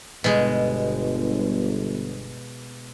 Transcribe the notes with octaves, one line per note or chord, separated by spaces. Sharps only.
G1 B2 G#3